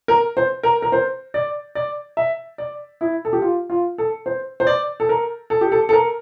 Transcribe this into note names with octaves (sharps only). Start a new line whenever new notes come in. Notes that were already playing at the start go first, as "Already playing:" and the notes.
A#4
C5
A#4
A#4
C5
D5
D5
E5
D5
E4
A4
G4
F4
F4
A4
C5
C5
D5
A4
A#4
A4
G4
A4
A4
A#4